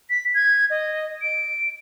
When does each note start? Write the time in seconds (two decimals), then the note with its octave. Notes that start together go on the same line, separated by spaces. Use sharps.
0.10 B6
0.34 G#6
0.70 D#5
1.22 D7